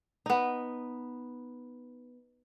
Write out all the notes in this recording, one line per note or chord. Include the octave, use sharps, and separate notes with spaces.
B3 D#4